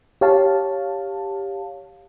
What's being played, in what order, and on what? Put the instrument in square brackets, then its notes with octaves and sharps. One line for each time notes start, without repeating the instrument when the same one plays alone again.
[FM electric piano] G4 C#5 F5 A5